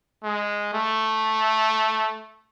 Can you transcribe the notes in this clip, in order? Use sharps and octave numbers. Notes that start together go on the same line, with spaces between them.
G#3
A3